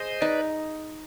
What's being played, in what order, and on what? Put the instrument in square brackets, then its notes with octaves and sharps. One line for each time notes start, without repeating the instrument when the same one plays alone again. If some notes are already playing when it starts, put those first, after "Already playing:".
Already playing: [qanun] G#4 [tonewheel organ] C5 D#5
[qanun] D#4 [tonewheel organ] B4 D5